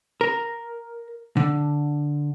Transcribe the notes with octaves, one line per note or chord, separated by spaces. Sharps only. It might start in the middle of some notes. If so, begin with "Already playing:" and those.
A#4
D3